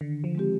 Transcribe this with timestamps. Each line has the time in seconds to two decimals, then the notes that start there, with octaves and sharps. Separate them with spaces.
0.01 D3 D#3
0.24 F3
0.35 G#3 C4 G4